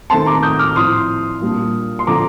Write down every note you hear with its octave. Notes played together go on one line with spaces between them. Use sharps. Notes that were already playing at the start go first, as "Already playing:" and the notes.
D#3 A3 C4 A5 C6
A#5 D6
D#6 G6
D6 F6
A2 F3 C4 C6 D#6
A#2 G3 A#3 D4
C6
D3 F3 A3 C4 A#5 D6